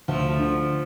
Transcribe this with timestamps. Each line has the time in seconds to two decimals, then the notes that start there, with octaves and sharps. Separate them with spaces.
0.08 D2 F3 A3
0.39 D3